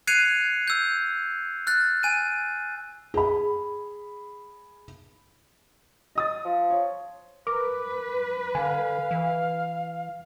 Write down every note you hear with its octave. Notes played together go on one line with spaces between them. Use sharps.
F#6 G#6 C7 C#7 D#7 F7
E6 G6
F6 F#6 A6
G#5 D#7
G#4 B5
D#5 D#6 A6
F3
C#5
A#4 B4 D6
D3 F5 G#5
E3